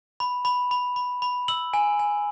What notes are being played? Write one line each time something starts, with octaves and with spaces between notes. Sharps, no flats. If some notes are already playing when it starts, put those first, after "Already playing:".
B5
B5
B5
B5
B5
E6 F#7
G#5
G#5